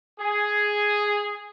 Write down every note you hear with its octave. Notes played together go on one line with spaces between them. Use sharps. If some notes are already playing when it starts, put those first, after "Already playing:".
G#4